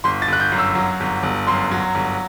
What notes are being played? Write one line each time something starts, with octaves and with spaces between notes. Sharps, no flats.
G1 C6
A6
G1 F#6
G6
F#2
E6
F#3
G1
G1
F#2 C6
F#3
G1